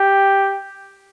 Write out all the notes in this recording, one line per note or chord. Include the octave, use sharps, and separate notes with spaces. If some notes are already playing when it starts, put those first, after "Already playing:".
Already playing: G4